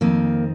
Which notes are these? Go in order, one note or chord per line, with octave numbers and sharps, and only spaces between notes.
F2 D#3 A#3 C4